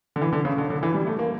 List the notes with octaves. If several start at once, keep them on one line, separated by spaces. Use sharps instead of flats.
D3
E3
D3
C#3
D3
D3
E3
G3
A3
A#3